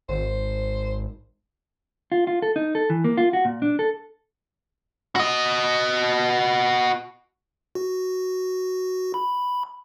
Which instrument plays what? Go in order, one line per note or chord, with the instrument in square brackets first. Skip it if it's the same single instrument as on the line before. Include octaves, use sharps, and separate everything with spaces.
[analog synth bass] G#1 [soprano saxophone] C5
[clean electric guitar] F4
F4
A4
D#4
A4
E3
A#3
F4
F#4
A#2
D4
A4
[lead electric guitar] F#4 D#5
[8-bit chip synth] F#4
B5